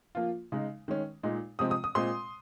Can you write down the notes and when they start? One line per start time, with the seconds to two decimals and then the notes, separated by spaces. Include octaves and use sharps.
0.15 F3 A#3 F4
0.52 C#3 G#3 D#4
0.88 D#3 G#3 C#4
1.23 A#2 G#3 D#4
1.59 C3 F3 G#3 C4 D#6
1.71 D#6
1.84 D#6
1.95 A#2 G#3 C4 C6